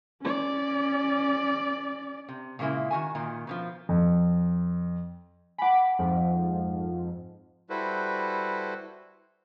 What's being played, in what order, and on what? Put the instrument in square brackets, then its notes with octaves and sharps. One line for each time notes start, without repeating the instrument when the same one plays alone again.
[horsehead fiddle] C#4 D5
[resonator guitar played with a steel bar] C3
A#2 C#3 G#3 A#3 E4
D#3 F#4 G#5
A#2 D#3
B2 D3 F3
[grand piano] F2
[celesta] F#5 G#5 [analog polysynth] B5 D6
[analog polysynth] F2 G#2 F3
[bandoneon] G3 E4 F#4 A4 B4 C5